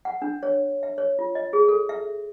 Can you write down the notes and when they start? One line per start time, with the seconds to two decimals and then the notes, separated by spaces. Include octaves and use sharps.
0.05 F#5
0.22 D4
0.43 C#5
0.83 E5
0.98 C#5
1.19 F4
1.35 D#5
1.53 G#4
1.68 A4
1.89 E5